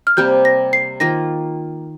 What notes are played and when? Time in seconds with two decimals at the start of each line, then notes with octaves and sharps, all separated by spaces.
0.07 F6
0.17 C3 G3 A#3 G4 G6
0.45 A#6
0.73 C7
1.00 D#3 A#3 F4 A#6